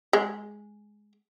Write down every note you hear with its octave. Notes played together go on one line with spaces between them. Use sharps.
G#3